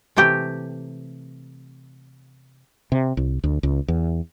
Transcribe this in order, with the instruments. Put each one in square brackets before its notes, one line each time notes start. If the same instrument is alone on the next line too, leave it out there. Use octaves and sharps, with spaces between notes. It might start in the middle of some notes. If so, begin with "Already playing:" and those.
[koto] C3 E3 A3 G4
[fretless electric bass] C3
C2
D2
C#2
E2